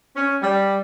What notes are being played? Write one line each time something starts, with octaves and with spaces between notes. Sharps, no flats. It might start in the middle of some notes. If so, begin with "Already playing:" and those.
C#4
G3